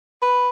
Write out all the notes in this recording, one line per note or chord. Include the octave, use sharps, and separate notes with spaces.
B4